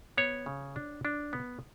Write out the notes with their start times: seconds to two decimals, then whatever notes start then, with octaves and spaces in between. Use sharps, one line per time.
0.18 B3 C#5
0.46 C#3
0.76 D4
1.05 D4
1.33 B3